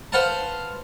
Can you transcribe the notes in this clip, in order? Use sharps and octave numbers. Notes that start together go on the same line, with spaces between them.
B4 C5 F5 F#5 A5